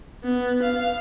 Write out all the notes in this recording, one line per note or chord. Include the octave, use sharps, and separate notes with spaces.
B3
F5